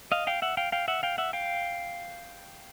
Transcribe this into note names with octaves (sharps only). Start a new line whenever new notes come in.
D#5 F5
F5 G5
E5 F#5
F5 G5
F5 G5
E5 F#5
F5 G5
E5 F#5
F5 G5